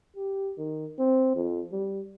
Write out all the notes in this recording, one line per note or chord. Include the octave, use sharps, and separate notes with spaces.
G4
D#3
C4
F2
G3